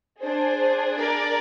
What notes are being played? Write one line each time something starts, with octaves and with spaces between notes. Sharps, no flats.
D4 G#4 C5
A#4 D5